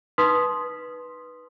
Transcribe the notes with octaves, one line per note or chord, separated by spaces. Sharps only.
D#4 B4 C6 D#6 B6